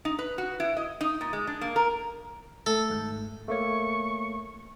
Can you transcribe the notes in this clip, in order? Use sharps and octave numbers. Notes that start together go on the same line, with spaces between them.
D#4
B4
F#4
E4
D#5
D#4
A#2
G#3
D4
A#3
A#4
A3 A4
G#1 G#2
A3 A#3 C#5 C#6